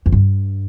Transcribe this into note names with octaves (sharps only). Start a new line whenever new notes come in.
F2
G2